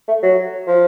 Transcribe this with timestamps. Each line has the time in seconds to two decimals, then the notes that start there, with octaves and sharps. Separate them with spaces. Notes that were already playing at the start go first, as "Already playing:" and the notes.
0.08 A3
0.23 F#3
0.67 F3